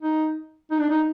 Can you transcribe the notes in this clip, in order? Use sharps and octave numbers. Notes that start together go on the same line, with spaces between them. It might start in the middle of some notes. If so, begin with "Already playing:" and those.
D#4
D#4
D4
D#4